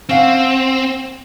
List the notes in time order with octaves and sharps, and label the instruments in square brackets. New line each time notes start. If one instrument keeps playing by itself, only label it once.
[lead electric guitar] C4 [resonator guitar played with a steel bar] C#4 F5 F#5